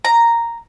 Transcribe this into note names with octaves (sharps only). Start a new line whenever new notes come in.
A#5